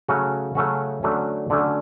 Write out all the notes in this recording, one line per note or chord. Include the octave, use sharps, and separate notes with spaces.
C#3 F#3 A3 C#4 F#4
C#3 F#3 A3 C#4 F#4
D3 F#3 A3 C#4
D3 F#3 A3 C#4